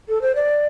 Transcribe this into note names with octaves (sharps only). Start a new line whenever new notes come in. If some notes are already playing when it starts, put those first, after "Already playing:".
A4
C5
D5